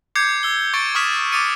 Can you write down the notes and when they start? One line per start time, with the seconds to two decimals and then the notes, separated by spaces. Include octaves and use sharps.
0.15 D6 G6 G#6 C7 C#7
0.43 E6 G7
0.73 C#6 G6 A6 C#7 D7
0.95 C#6 D#6 F6 B6 E7
1.32 D6 D#6 A6 C#7 D#7